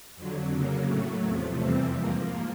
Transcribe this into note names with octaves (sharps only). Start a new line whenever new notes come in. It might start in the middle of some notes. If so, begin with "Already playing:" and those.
F2 D3 F#3
C#3 F#3 A#3
A2 F#3 A3
E2 C3 F3 A3
F2 C3 E3 G3 C4
G#2 F3 A#3